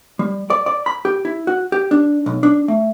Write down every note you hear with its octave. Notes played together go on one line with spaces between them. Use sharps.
G3
D5
D5
B5
G4
E4
F#4
G4
D4
B1
D4
A3